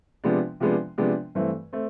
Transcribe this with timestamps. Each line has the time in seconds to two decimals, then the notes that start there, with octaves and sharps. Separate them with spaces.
0.24 C3 F3 G#3 B3 D4
0.60 C3 F3 G#3 B3 D4
0.98 C3 F3 G#3 B3 D4
1.35 G2 E3 A3 C4
1.73 A3 C4